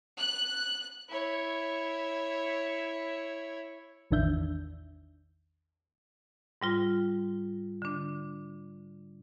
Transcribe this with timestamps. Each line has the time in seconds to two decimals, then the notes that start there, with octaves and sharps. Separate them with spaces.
0.18 F#6
1.09 E4 C#5
4.11 A1 E2 D#3 D4 E5 G6
6.62 G#2 G3 F4
7.82 D3 D4